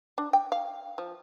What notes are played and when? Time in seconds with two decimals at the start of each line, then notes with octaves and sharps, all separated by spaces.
0.18 D4
0.33 G5
0.52 F5
0.98 F3